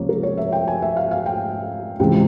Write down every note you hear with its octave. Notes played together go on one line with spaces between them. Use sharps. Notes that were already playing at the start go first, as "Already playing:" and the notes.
Already playing: C#2 C3 F3 A#3 C#5
A#4
C#5
E5
G5
G#5
E5
F5
F5
G5
C#2 C3 E3 G#3 G5